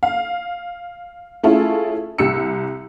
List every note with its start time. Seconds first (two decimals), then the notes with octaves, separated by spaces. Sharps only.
0.03 F5
1.43 A3 C#4 E4 F4 G#4 A4
2.18 C2 G4 E6 C#7